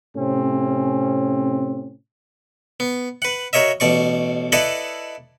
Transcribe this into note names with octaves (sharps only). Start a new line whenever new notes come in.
A2 C3 C4 C#4
B3
B4 F#5
F#4 A#4 C#5 D#5 E5
A1 B2 D5 C#6
E4 A4 B4 D5 D#5 F#5